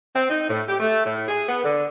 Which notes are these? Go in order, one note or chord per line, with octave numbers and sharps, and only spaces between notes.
C4
D#4
A2
G4
A3
A2
G#4
B3
D3